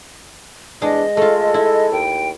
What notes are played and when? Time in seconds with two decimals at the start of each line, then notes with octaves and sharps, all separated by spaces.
0.82 E2 G#3 D4 D#5
1.17 G#3 A3 F4 A4
1.54 E4
1.92 D#2 G5